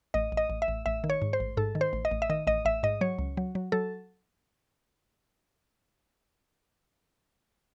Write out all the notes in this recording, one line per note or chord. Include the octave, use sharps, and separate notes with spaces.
A1 D#5
A1
D#5
A1
E5
A1
A1 E5
D#3
C#5
G#2
C5
A1
G#2 A4
D#3
C5
A1
D#5
A1
E5
D#3 D#5
A1 D#5
A1 E5
G#2 D#5
F#3 C#5
C#2
F#3
F#3
F#3 A4